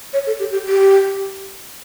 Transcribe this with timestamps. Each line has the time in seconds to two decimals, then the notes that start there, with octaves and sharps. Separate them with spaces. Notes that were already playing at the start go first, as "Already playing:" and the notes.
0.13 C#5
0.27 A4
0.39 G4
0.52 G4
0.65 G4